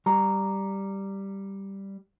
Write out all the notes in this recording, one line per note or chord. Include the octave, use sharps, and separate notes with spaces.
G3 A#5